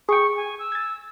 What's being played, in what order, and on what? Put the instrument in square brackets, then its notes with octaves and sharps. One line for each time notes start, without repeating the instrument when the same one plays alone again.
[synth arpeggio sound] G#4 G5 [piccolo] C#6
[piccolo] G#5
E6
[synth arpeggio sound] G#6 A6